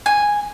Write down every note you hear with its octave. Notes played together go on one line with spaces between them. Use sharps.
G#5